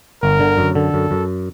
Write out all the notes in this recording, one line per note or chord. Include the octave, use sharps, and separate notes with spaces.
G1 A#4
D3
F#2
D3 A4
F#2
F#2